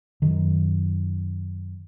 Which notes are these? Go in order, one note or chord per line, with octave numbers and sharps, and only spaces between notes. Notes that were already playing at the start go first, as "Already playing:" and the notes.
F#2 D#3